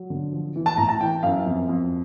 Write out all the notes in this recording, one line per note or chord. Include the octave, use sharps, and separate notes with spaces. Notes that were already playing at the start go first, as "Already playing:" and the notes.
Already playing: F#3
D3
F3
E3
A5
A2 A#5
A5
E3 G5
F#2 F5
F2
F2